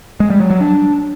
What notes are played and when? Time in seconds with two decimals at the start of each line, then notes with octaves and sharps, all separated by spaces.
0.20 G#3
0.30 G3
0.40 F#3
0.50 F#3
0.60 D4